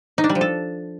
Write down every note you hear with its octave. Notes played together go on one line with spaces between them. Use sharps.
D#4
D4
G3
F3
A4